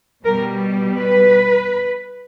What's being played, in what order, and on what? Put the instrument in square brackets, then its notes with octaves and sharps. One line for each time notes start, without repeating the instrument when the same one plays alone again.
[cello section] B2 G3 A#4
B4